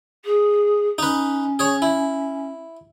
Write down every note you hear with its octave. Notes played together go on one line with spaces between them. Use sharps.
G#4
C#4 D#4 B4
G#4 C#5
E4